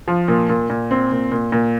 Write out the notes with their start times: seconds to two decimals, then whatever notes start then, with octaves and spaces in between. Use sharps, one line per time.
0.08 F3
0.28 A#2
0.49 A#2
0.70 A#2
0.91 C4
1.11 A#2
1.32 A#2
1.52 A#2